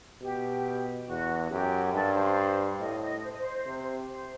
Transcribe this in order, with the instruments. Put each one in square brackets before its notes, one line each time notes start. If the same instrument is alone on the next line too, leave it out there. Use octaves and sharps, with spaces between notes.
[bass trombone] B2 [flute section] G4
[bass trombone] E2 [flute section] F#4
[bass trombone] F#2 [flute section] G4
[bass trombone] G2 [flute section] A4
[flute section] C5
[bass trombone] A2 [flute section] D#5
[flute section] D#5
C5
D#5
C5
[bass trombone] C3
[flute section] C5